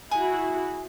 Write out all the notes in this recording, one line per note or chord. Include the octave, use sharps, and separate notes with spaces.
E4 F#4 G#4